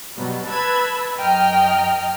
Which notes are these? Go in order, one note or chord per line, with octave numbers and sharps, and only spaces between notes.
B2 F#3 G3
B4 A5 B5 E6 G#6
F#2 F#3 D#5 G5 A#5 F6